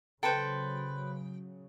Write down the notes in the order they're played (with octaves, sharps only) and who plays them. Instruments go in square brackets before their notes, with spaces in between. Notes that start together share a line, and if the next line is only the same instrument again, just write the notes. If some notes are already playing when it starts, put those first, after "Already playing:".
[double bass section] C#3 F#3 [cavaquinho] A4 B4 C5 [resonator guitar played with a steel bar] G5